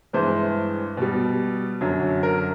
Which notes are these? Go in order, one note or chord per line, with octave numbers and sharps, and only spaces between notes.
G2 E3 G#3 C5
B2 G3
F#2 D3 F#3
A#4